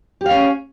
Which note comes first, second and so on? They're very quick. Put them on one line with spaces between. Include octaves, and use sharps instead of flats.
G4 F5 C#4